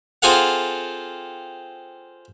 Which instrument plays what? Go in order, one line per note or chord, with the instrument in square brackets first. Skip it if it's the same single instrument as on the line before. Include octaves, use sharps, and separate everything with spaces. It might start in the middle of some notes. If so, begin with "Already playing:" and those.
[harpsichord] C4 F4 G#4 A4 F5 F#5